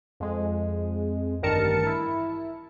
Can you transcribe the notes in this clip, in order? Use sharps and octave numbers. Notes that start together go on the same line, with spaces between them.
F2 G#3
A1 G2 D#3 A#4 A5 C#7
E4